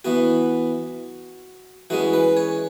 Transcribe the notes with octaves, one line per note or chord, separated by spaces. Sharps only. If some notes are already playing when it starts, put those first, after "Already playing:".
E3 B3 F#4
E3 G#3 C#4 F#4
B4
C#5